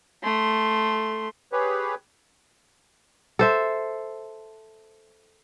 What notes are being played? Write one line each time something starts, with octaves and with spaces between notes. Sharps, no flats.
A3 C6
G4 G#4 B4 C#5
A4 C5 E5